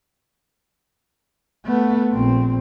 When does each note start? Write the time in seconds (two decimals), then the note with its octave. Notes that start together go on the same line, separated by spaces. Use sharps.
1.66 A3 B3
2.13 A#1 C4